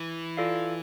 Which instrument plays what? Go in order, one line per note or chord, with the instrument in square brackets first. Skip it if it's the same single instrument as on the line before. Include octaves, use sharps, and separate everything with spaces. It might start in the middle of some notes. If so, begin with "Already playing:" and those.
Already playing: [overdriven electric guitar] E3
[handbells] F4 A4 D5 F5